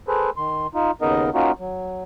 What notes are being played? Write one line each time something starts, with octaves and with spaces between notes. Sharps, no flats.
G#4 A4 B4 C5
D#3 C6
D#4 F4
D#2 C#3 B3 D#4 A#4 D#5
A#3 C#4 D#4 F4 F#4
F#3